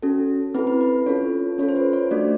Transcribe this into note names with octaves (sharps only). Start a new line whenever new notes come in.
C#4 F#4 A4
C4 E4 A4 B4
B4
B4
C#4 F4 A4 C#5
C#4 F4 A4 C#5
C5
B4
C#5
A3 D4 F#4 D5